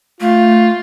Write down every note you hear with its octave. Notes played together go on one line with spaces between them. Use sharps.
A3 F4